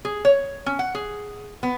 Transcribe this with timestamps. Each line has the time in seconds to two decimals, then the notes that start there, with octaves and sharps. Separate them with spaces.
0.05 G#4
0.25 C#5
0.66 C#4
0.79 F#5
0.95 G#4
1.63 B3